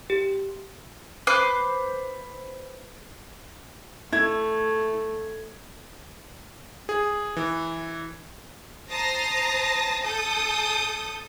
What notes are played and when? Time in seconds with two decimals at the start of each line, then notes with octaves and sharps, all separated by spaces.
0.10 G4
1.27 B4 C5 D6 F#6
4.13 A3 E4 G#6
6.89 G#4
7.37 E3
8.89 C5 A5 A#5 D#6 A#6 C7
10.02 A4 A5 D#6 G6